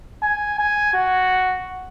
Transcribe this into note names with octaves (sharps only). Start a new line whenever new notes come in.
G#5
G#5
F#4